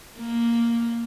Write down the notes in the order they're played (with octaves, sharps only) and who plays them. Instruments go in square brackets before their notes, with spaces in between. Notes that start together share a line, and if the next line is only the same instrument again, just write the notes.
[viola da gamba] A#3